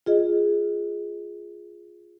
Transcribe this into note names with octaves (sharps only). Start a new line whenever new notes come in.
F4 G#4 D#5